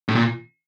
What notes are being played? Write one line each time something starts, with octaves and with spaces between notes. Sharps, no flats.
A2
A#2